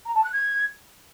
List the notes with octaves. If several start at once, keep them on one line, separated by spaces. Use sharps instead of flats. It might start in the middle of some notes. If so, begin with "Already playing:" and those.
A#5
A5
F#6
G#6